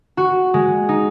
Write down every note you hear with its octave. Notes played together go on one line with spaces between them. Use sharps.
F#4
G#3
D#4